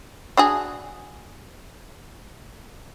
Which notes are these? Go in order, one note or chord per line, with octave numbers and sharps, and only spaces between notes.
D4 F#4 G#4